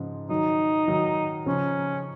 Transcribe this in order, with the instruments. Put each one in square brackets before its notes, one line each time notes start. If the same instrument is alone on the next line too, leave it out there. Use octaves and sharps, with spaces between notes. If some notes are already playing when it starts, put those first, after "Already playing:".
Already playing: [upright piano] G#2 C#3 F3
[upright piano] D#3 F#3 [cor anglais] D#4
[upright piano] D#3 F#3
[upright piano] C#3 F3 [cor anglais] C#4